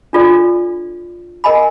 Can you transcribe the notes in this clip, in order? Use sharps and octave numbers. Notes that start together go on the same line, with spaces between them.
D4 F4 A4 D5
A#4 D#5 G#5 B5